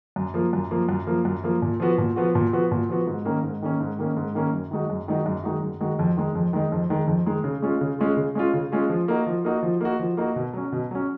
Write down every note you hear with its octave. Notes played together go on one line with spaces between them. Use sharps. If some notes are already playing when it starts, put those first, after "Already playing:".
F#2
F3 A#3
F#2
F3 A#3
F#2
F3 A#3
F#2
F3 A#3
A#2
F3 B3 F#4
A#2
F3 B3 F#4
A#2
F3 B3 F#4
A#2
F3 B3 F#4
G#2
D#3 A#3 C#4
G#2
D#3 A#3 C#4
G#2
D#3 A#3 C#4
G#2
D#3 A#3 C#4
F#2
D#3 G#3 D#4 F#4
F#2
D#3 G#3 D#4 F#4
F#2
D#3 G#3 D#4 F#4
F#2
D#3 G#3 D#4 F#4
F2
D#3 G#3 D#4
F2
D#3 G#3 D#4
F2
D#3 G#3 D#4
F2
D#3 G#3 D#4
C#3
G#3 C#4 F4
C#3
G#3 C#4 F4
C#3
G#3 C#4 F4
C#3
G#3 C#4 F4
F3
A#3 D#4 F#4
F3
A#3 D#4 F#4
F3
A#3 D#4 F#4
F3
A#3 D#4 F#4
B2
F#3 C#4
B2
F#3 C#4